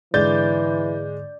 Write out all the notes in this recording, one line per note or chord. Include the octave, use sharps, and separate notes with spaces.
G#2 D3 E3 G#3 D5 G6 A6